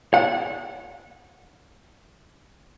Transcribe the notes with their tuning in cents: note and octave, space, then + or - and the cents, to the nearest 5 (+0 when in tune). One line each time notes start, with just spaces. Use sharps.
F#5 -25